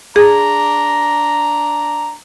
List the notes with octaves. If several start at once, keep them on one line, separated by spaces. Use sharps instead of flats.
D4 G#4 A#5